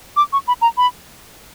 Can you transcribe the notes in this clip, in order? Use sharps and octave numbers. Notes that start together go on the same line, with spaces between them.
D6
C#6
B5
A#5
B5